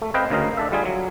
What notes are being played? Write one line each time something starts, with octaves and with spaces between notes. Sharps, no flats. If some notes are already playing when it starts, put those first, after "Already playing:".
A3
C4 B4 D#5 F5 G5
D2 C#3 A#4 D#5 F5
D4 A4 E5
D3 G3 F4 G#4
F#3